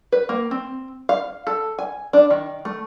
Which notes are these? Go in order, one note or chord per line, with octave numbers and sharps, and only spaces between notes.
B4
A#3
C4
F5
A4
G#5
D4
D#3
A3